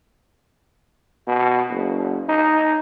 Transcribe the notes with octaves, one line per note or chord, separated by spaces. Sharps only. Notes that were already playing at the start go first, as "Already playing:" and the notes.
B2
F#1
D#4